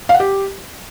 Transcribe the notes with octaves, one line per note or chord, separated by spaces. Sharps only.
F5
F#5
G4